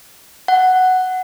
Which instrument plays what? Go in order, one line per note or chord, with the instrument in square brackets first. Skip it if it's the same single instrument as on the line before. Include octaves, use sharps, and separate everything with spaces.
[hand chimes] F#5